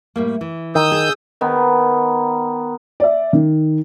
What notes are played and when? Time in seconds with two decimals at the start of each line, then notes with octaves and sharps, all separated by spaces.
0.16 A2 G3 A#3
0.41 E3
0.75 D#3 D#6 E6 G6
0.91 G#4
1.41 D#3 B3
3.00 D5 E5
3.33 D#3